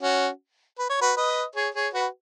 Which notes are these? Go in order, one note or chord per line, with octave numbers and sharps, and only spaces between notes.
C#4 F#4
B4
C#5
F#4 B4
B4 D#5
G#4 C#5
G#4 C#5
F#4 B4